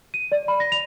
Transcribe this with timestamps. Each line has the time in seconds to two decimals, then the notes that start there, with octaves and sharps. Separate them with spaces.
0.14 D#7
0.32 D5
0.48 B5
0.60 A#6
0.72 F7